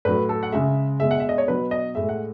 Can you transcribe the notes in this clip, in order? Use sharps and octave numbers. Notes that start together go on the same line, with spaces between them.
A2 F#3 B4
A4
F#5
C#3 G#3 E5
B2 G#3 E5
F#5
E5
D#5
C#5
B2 F#3 B4
D#5
A2 G#3 E5
F#5